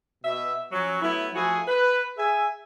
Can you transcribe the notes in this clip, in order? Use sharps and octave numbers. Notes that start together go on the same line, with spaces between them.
B2 E5
F3 F#3 C#4
F#3 A3 B3 E4
F3 A3 E4 F#4 G#4
B4
G#4 E5 G#5